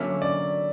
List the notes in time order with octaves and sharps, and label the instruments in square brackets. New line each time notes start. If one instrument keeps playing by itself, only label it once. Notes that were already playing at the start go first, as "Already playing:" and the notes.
Already playing: [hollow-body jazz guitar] D3 F#3 A#3 C#4 [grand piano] E5
[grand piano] D5